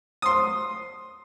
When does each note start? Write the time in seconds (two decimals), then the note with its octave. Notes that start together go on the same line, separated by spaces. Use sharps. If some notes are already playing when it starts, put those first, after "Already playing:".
0.22 C6 D#6